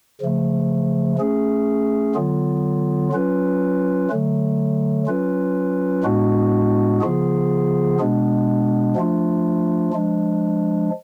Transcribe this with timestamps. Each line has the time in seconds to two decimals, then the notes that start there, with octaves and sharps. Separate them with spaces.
0.21 C#3 F3 A3
1.18 A3 C#4 G#4
2.15 D3 F#3 B3 F4
3.12 F#3 C#4 F4 B4
4.10 D3 F#3 A3
5.06 F#3 C#4 F4 B4
6.04 A2 G#3 B3 D4 F#4
7.01 C#3 F3 B3 F4 G#4
7.99 B2 G#3 B3 D4
8.96 F3 A3 D4 F4
9.93 F3 G#3 D4